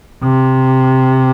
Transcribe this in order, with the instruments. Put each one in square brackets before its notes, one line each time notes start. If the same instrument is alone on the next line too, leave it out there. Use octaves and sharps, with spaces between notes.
[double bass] C3